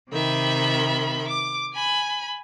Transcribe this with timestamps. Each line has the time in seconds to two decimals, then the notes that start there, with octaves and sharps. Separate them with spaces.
0.12 C3 D#3 E5 B5
1.27 D6
1.73 G#5 B5